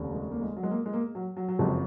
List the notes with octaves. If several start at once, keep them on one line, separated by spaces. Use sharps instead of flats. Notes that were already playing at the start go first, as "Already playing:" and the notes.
Already playing: F1 D#2 C#3
G#3
A#3
G#3
F#3
G#3
A#3
G#3
A#3
F#3
F#3
F#3
F#1 F2 C3 F#3 G#3